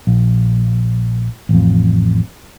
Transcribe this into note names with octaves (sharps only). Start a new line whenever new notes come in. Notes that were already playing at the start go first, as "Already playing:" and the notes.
A#1
A1 F2